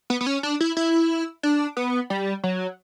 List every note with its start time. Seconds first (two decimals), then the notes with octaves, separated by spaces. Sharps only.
0.10 B3
0.21 B3
0.26 C#4
0.43 D4
0.60 E4
0.77 E4
1.43 D4
1.77 B3
2.10 G3
2.44 F#3